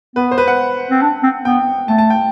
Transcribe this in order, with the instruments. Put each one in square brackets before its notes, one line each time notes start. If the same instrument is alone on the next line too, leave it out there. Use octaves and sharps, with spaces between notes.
[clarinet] B3 [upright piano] B4
[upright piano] C5
B4
F#5
[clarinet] C4
D4
C4
[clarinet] B3 [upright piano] G5
[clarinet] A3 [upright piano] A5
[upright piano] A5
G5